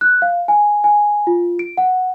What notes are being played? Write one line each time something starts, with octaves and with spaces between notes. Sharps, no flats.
F#6
F5
G#5
G#5
F4
D7
F#5